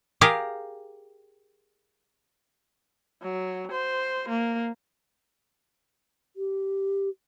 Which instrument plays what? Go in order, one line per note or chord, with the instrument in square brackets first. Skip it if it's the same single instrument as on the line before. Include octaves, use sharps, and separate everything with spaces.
[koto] G4 G#4 A#4 F5
[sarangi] F#3
C5
A#3
[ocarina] G4